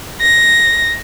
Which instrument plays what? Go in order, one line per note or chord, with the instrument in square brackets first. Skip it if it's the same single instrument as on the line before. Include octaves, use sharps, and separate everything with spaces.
[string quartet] A#6